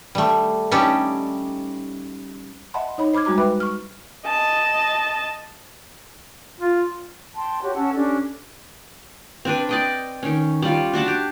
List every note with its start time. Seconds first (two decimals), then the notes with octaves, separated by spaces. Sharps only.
0.15 G3 A3
0.71 G3 C#4 D#4 G4 A4 D5
2.74 D#5 E5 F#5 A5 B5 C6
2.98 D#4 C#5 D#5 B5
3.13 C5 B5 D6 F6 G#6
3.25 G3 G#3 F#4 A#5 D6
3.38 B4 E5 G5 B5 D6 F#6
3.60 C#6 F6
4.26 D#5 A5
6.61 F4
7.36 G5 A5 C6
7.62 F#4 G4 C#5
7.74 C#4 F#5 A5 E6
7.94 C#4 D4 G4 A4
9.45 C4 D4 B4
9.69 D5 D#5 G5
10.23 D#3 C#4
10.62 G3 F4
10.93 D4 F#4 F#5 A5
11.08 G4